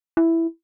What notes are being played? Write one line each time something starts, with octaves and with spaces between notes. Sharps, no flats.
E4